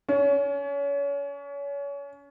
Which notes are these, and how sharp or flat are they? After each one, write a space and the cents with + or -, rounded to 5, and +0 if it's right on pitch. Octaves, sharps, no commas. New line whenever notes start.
C#4 +30